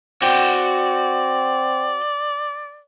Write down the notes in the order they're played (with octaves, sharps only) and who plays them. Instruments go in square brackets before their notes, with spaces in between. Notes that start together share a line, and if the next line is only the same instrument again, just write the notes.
[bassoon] C4 [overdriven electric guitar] F#4 G5 [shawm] D5